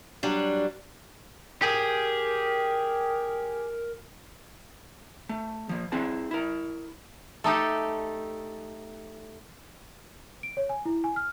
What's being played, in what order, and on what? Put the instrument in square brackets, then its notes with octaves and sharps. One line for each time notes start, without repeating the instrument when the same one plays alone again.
[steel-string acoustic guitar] F#3 G3 D4
[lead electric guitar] G4 G#4 [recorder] A#4
[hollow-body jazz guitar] A3
F3 A#3
C4 E4 G#4 A5
E4 A#4
[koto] A3 D#4 G4 A4
[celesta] D7
C#5
G#5
E4
G#5
F6